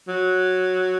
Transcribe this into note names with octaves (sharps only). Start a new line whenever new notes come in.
F#3